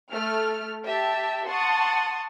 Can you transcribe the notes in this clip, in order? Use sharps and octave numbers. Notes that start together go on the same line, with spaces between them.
A3 F6
G4 E5 A5
F#5 A5 C6 C#6 D#6